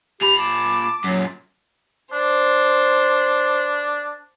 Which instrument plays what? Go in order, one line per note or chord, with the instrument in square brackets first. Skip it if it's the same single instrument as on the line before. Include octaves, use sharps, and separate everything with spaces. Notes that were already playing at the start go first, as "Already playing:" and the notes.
[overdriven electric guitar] A#2 B5 [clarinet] G4 [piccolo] F7
[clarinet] A5 [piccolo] D6
[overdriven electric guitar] F#2 A#2 [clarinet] F#3
[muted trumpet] D4 [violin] C5